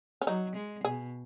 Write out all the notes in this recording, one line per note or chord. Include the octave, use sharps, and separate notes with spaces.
C#4
F#3 D#4
G#3
B2 G#4